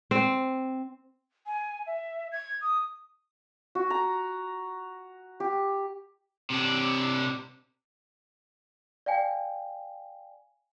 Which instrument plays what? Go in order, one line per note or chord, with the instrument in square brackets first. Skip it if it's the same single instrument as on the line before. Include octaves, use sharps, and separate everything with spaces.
[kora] C4
[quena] G#5
E5
G#6
D#6
[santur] F#4
A#5
G4
[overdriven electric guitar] C3 D4
[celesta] D5 F5 G5 G#5